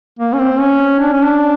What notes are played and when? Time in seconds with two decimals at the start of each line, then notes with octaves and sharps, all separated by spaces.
0.19 A#3
0.33 C#4
0.39 C4
0.60 C#4
1.00 D4
1.12 C#4
1.23 D4